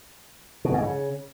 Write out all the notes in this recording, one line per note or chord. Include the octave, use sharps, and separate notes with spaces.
B2
G#2
C#3